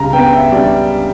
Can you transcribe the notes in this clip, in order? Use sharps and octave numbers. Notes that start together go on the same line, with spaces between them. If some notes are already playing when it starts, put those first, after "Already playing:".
Already playing: C#2 C#3 G3 A#5
B3 G5
E5
G3 D5